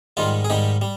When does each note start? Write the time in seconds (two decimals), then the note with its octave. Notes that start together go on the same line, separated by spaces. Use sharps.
0.17 G#2 D#3 G3 F4
0.45 G#4
0.50 G#2 D#3 G3 G4
0.81 G3